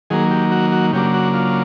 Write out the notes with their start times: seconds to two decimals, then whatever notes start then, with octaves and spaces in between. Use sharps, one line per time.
0.10 D#3 F#3 A#3 G#4
0.31 G4
0.51 F#4
0.72 F#4
0.93 C#3 F#3 A#3 D4 G4
1.14 F#4
1.34 F4